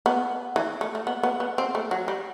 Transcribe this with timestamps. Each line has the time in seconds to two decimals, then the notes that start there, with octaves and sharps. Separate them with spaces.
0.06 B3
0.56 E3
0.81 A3
0.95 A3
1.07 B3
1.23 B3
1.40 B3
1.58 C4
1.75 A3
1.91 F#3
2.08 G3